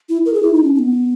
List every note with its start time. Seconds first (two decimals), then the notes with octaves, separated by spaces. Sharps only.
0.09 E4
0.26 A#4
0.34 G#4
0.43 E4
0.53 D#4
0.64 C#4
0.75 C#4
0.79 B3